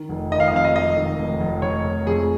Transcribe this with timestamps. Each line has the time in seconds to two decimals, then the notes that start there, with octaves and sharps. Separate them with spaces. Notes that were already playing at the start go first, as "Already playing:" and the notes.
Already playing: D#3
0.09 F1
0.32 D#3 D#5
0.40 F5
0.48 D#5
0.53 F2 F5
0.65 D#5
0.75 F2 D#5
0.97 D#3
1.19 F1
1.40 F1
1.62 F1 C#5
1.85 F1
2.06 F2 G#4